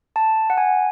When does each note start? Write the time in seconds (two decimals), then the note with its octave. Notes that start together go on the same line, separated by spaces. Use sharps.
0.16 A5
0.50 F#5
0.58 G#5